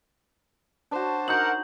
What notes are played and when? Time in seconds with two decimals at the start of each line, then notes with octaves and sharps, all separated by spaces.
0.91 D4 F#4 C5 A5
1.28 D#4 F#4 A#4 F#5 G6 F#7